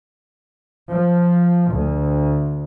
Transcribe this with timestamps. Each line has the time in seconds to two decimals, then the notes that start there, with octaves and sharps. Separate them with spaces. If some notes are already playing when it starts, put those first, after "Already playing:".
0.89 F3
1.71 D2